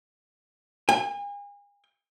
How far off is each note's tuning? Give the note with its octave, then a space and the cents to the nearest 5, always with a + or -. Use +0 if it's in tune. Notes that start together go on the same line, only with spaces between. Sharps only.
G#5 -40